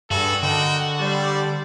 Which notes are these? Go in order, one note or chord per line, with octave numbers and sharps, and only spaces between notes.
G2 F#4 G#4 A4
D3 A#4 D#5 G5
G3 A4 C5 D5